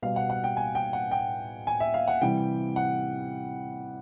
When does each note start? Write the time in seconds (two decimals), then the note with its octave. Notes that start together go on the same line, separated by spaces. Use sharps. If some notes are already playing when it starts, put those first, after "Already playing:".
0.02 B2 G3 F5
0.16 F#5
0.30 F#5
0.44 G5
0.57 G#5
0.75 G5
0.93 F#5
1.11 G5
1.67 G#5
1.80 E5
1.94 F5
2.08 F#5
2.21 C3 E3 G3 G5
2.76 F#5